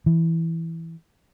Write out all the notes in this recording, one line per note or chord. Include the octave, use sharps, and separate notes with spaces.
E3